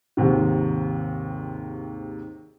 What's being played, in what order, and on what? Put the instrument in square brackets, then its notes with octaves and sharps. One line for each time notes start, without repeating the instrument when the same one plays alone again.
[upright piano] D#2 G#2 C3 D#3